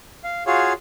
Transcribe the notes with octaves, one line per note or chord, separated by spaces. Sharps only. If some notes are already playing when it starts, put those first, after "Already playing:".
F5
F4 F#4 G#4 C#5 F5